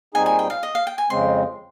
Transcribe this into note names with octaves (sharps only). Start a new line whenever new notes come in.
A#2 G3 C4 D#4 G#4 G#5
G#5
G5
F5
D#5
F5
G5
G#5
F2 C#3 G#3 C4 C6